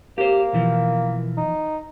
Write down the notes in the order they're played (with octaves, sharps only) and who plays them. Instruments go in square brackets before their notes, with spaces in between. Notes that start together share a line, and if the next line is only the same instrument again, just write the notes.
[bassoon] A#3 [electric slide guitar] G4 C5
[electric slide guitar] B2 E3 F3
[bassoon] D#4